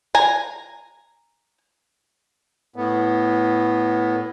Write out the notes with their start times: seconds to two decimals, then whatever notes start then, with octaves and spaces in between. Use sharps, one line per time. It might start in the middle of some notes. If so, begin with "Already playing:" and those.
0.15 G#5 A#5
2.76 A2 B3